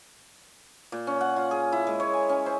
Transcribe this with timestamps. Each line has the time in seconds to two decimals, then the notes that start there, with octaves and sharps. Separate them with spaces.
0.92 A#2
1.07 C#4
1.21 F#5
1.36 F4
1.51 G#4
1.72 E4
1.87 G#3
2.00 C#5
2.13 G#5
2.29 C#4
2.46 C5